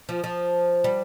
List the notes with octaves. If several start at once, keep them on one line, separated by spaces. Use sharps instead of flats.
F3
F3
G3